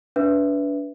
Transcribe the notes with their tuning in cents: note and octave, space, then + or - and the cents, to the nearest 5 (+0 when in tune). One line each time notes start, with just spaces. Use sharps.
D4 -30 B4 +0 E5 +0